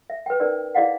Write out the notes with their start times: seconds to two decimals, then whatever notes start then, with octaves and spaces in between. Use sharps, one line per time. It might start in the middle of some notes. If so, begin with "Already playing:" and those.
0.10 E5
0.26 B4 G5
0.40 C#4 D#4 A#4 B4 D5
0.75 E4 G#4 D5 D#5 F5 F#5